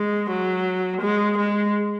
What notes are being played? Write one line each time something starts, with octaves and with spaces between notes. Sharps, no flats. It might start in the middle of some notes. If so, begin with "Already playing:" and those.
Already playing: G#3
F#3
G#3
G#3